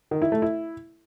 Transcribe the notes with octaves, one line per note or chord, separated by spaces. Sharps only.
D#3
E4
A3
E4